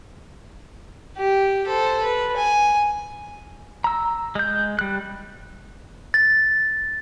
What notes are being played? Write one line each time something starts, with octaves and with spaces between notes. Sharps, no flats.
G4
A4 C5
B4
G#5
A#5 E6
G#3 G6
G3 F#6
A6